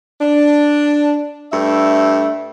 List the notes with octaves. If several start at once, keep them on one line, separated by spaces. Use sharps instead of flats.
D4
G2 A3 E5